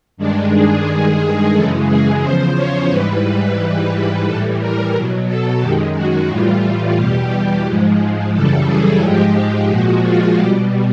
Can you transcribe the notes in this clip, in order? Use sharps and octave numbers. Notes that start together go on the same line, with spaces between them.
G2 D#3 G#3 D4
G#4
G2 D#3 G#3 G#4
F#2 C#3 E3 G#3 A4
G#4
E2 C#3 F3 C5
C#5
G#2 E3 G3 B4
B4
G#2 E3 G3 B4
A2 E3 G3 A4
A#4
B2 F#3
A4
F#2 D#3 G#3 G4
F#4
A2 E3 G3 F4
F4
E2 B2 G3 G4
G#2 F3 G#3
F#2 C#3 E3 G3 A4
G#4
G#2 F3 G#3 G4
G4
A#2 F3 G#3 F#4
F4
B2 G3 G4